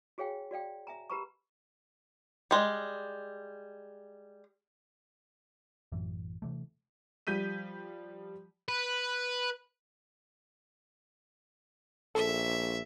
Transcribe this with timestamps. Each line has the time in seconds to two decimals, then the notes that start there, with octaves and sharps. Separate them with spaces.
0.18 F#4 G#4 C#5 F5 G5 G#5
0.51 F#4 D5 F5 G5
0.87 E5 G#5 A#5
1.10 G4 A#4 B4 A#5 B5 C#6
2.51 G3 G#3
5.92 A1 F#2 E3
6.42 C3 E3 A3
7.27 F3 G3 G6 B6 D#7
8.68 B4
12.15 A#1 A4 E5